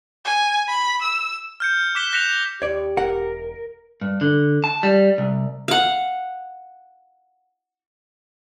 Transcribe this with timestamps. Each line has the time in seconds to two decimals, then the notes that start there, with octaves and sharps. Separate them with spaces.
0.25 G#5
0.68 B5
1.01 E6
1.60 F6 G6 C#7
1.95 D6 F#6 B6 E7 G7
2.13 F#6 A#6 B6 C#7 E7 F7
2.62 D#2 G4 C#5 D5
2.97 E1 A#4 F#5
4.01 G2
4.21 D3
4.64 A5
4.83 G3
5.18 C2
5.68 F5 F#5